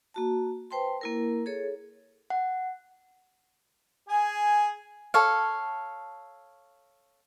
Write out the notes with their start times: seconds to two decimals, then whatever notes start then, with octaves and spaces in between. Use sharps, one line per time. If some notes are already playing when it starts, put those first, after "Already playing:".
0.14 A#3 F#4 A5
0.71 B4 C5 G5 A5 C6
1.01 A#3 E4 A#4
1.46 G#4 A4 C#5
2.30 F#5
4.09 G#4 G#5
5.14 A4 C#5 F5